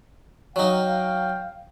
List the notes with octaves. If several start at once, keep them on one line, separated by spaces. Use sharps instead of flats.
F#3 D#4 F5 G5